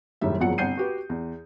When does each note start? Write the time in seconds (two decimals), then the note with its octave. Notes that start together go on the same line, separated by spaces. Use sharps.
0.21 F#1 F#2 A2 D#3 G3 E5
0.40 F#1 E2 F3 F#3 F#5 C#7
0.58 G1 C2 F#5 G6 C7 D#7
0.77 F#4 G4 B4
1.09 E2